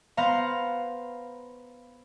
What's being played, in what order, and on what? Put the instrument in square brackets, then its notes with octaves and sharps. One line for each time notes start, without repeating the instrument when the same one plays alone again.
[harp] B3 B4 C5 F5 A#5